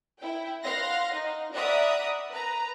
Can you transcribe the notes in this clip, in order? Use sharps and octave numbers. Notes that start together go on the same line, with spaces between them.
E4 G5
F5 F#5 C6 A#6
D#4
D5 E5 F#5 A#5 B5 D#6
B4 A#5